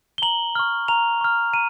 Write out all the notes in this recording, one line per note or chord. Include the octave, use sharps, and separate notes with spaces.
G7
A#5 F#7
C#6 F6
A#5 F7
C#6 F6
A#5 D#7